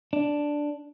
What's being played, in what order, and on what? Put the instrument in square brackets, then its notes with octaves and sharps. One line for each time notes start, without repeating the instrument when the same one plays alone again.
[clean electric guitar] D4